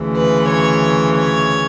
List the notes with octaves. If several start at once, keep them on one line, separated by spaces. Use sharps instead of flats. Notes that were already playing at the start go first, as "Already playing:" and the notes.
Already playing: D2 C#3 E3
B4
C#5
C#5